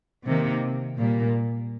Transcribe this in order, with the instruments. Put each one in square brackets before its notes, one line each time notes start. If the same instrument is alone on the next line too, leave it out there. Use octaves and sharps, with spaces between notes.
[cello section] C3 D#3 A#3
A#2 G3 A#3